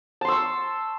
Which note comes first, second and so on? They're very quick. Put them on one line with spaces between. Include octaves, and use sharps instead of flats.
A5 C6 E6 C#6